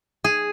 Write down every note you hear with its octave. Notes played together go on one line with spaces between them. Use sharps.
G#4